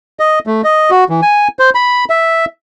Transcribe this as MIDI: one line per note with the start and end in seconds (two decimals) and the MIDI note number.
0.20 0.39 75
0.47 0.62 57
0.64 0.90 75
0.91 1.04 66
1.09 1.21 52
1.22 1.48 80
1.59 1.70 72
1.75 2.05 83
2.10 2.45 76